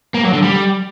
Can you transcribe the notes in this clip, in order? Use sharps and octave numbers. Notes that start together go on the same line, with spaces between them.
A#3
F#3
D3
G3